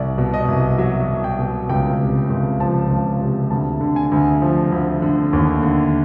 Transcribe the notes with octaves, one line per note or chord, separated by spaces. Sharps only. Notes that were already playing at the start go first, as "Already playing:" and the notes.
Already playing: C2 D5
B2
D#5
C2
F#3 E5
C2
G5
B2
C#2 G5
C3
C#2
F3 A5
C#2
C3
D2 A5
D3
G#5
D2
F3
D2
D3
D#2
D3